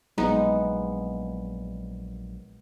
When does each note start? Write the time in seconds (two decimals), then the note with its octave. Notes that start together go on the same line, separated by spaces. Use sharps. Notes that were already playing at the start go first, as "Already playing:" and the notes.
0.18 A#1 F#3 G#3 B3 D#4